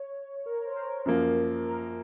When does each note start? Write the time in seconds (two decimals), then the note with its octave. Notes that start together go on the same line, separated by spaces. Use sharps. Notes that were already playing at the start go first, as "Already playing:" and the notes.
Already playing: C#5
0.46 A#4
0.65 C5
0.76 A#4
1.06 F#2 F3 A#3 A#4
1.65 A#4